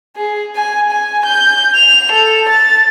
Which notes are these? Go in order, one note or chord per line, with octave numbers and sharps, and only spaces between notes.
G#4
G#5
G#5
G6
F7
A4
A6